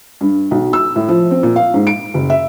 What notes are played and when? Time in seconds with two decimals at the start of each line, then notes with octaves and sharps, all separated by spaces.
0.21 G2
0.51 B1
0.73 E6
0.96 A2
1.08 F3
1.31 C4
1.43 A#2
1.56 F5
1.74 G#2
1.87 D7
2.14 F#1
2.30 E5